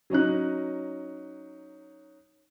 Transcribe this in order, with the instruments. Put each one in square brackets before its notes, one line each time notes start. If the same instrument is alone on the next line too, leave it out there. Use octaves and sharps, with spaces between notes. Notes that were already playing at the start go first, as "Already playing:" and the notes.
[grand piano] F#3 C#4 D#4 F#6